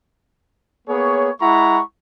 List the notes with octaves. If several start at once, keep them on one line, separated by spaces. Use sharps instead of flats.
A#3 B3 G#4 C#5
G#3 E4 F#5 A#5 B5 C#6